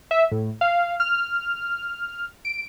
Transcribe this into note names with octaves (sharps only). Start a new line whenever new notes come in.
E5
A2
F5
F6
D7